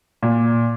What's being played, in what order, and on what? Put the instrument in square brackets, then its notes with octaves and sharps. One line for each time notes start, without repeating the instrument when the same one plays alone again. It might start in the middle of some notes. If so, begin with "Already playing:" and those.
[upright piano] A#2